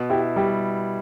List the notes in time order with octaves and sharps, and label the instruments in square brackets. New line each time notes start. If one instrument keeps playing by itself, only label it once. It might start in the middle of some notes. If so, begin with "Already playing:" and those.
Already playing: [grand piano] B2
[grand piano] E4 [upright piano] G4
[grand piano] G3 [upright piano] G4